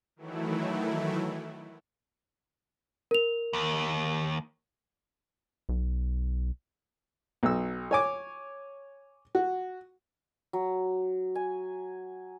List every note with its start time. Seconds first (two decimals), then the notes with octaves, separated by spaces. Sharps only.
0.16 D#3 E3 F#3 A3 E4
3.11 A#4 F7
3.53 D#2
5.69 B1
7.43 B1 E6
7.91 C#5 G#5 D6
9.35 F#4
10.53 F#3
11.35 G#5